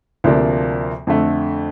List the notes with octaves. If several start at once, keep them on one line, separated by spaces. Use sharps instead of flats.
D2 C3 F3 A#3 D4
F2 D3 A3